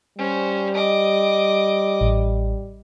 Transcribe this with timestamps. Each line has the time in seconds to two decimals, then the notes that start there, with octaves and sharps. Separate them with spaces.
0.18 G3 C#4 C5
0.74 D#5 D6
2.01 A1